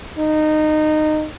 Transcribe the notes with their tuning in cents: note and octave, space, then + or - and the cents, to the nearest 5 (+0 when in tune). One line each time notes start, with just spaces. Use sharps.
D#4 -20